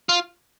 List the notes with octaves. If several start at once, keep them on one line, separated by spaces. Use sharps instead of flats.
F4